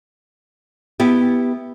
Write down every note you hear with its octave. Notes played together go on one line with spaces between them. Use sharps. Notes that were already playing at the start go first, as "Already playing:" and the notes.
B3 E4 G4